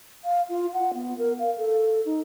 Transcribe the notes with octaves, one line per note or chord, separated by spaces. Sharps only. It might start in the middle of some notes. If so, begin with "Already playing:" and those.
F5
F4
F#5
B3
A#4
F5
A4
D#4